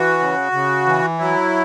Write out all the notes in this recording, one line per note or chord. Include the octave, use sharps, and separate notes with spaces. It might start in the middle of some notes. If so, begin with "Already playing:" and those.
Already playing: E3 F#4
C#3
C#3
E3
F#3 E4